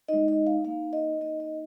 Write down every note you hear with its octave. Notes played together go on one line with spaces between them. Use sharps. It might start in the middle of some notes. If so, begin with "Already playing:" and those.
G#3 D#4 D#5
D#5
F5
A#3 D#4 F5
D#5
A#3 D#4 D#5
D#5